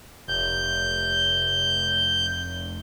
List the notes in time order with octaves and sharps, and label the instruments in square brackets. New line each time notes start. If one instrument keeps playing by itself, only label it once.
[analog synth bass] F1 [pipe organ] G6